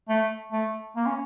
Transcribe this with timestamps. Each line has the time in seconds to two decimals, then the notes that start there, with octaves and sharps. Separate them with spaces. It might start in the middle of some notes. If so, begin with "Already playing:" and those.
0.09 A3
0.53 A3
0.96 A#3
1.06 C#4